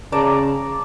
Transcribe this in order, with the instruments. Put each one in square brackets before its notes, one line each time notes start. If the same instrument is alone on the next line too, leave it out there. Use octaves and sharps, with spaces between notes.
[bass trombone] C#3 [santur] D5 A5 A#5